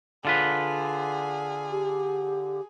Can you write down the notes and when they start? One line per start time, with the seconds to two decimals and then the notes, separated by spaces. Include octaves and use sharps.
0.25 D3 F4 G#4 B4
1.71 G4